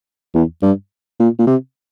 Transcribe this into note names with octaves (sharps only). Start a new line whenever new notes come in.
E2
G2
A#2
A#2
C3